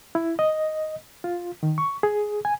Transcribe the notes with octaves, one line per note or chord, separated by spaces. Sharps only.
E4
D#5
F4
D#3
C#6
G#4
G#5